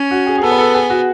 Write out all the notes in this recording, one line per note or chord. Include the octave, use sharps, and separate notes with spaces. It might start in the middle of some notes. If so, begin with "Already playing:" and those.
Already playing: C#4
F#4
G#4
G#4
B3 A4
B4
A4
G#4
F#4